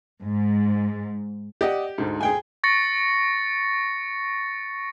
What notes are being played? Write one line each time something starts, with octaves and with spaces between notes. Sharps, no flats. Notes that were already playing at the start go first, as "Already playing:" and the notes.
G#2
G4 D5 D#5 F#5
D2 G#2
G#4 G5 G#5
C#6 A6 A#6 C#7